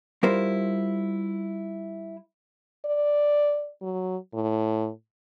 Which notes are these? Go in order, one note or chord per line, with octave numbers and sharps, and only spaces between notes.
G3 E4 F4 A#4 C5
D5
F#3
A2